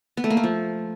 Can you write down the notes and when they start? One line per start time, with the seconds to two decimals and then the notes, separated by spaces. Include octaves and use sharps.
0.17 B3
0.24 A3
0.30 A#3
0.37 A3
0.43 F3